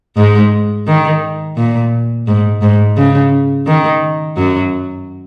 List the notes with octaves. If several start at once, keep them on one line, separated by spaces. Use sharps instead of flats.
G#2 G#3
D#3
A#2
G#2
G#2
C#3
D#3
F#2 F#3